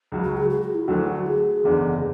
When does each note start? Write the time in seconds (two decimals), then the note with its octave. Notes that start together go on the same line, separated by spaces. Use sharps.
0.12 C#2 C#3 F#3
0.24 F#4
0.37 G#4
0.50 G#4
0.62 F#4
0.75 E4
0.88 D2 D3 F#3 A3 F#4
1.26 G#4
1.64 F#1 E2 D3